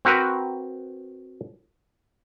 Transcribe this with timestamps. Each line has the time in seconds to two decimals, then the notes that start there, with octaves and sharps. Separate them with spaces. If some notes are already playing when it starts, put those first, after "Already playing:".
0.05 C4 F#4 A#4 B4